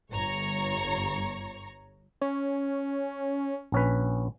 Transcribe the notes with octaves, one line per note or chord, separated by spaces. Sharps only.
G1 C#5 A#5 C#6
C#4
A#1 C#4 B4